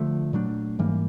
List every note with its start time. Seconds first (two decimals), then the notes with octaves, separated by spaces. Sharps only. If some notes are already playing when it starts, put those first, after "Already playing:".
Already playing: D3 F3 A3
0.33 A#2 F#3 A3 D4
0.79 G#2 E3 G3 A#3